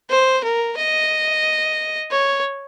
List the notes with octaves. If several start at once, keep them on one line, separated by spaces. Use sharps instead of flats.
C5
A#4
D#5
C#5